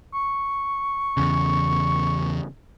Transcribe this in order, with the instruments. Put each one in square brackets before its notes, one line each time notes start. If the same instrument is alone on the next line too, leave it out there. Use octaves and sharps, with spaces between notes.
[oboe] C#6
[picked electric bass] E2 C#3